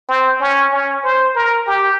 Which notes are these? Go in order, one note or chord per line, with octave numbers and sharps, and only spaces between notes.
C4
C#4
C#4
C5
A#4
G4